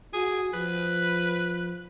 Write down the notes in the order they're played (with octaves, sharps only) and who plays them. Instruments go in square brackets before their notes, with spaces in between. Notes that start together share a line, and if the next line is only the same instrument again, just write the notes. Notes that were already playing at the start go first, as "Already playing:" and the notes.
[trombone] F#4 [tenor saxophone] G#4
[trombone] F3 [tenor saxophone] B4